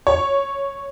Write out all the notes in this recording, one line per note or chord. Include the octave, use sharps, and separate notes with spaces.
C#5